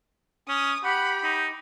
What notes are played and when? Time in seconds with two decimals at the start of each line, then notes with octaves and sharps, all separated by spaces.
0.48 C#4 D#6
0.84 G4 F#5 B5
1.23 D#4